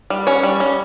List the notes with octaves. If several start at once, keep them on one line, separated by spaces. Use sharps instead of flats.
G3
C#4 C#5
G3
C#4